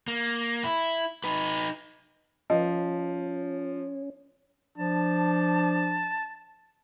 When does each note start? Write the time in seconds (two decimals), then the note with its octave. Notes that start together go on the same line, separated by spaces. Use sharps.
0.08 A#3
0.64 E4
1.24 D#4 B4
2.50 F3 C#4 B4 D#5
4.78 F3 D4 A5